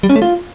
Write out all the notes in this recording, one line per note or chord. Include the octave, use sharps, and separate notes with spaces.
G3
C#4
A3
F4